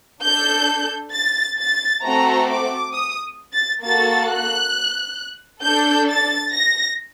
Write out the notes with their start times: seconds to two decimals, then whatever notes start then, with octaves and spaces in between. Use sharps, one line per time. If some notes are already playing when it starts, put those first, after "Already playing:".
0.22 D4 A4 G6
1.13 A6
1.57 A6
2.03 A3 C4 F#4 A4 A#5
2.48 D6
2.93 D#6
3.52 A6
3.82 A#3 F#4 A4 A6
4.27 F#6
5.62 D4 A4 G6
6.07 A6
6.52 A#6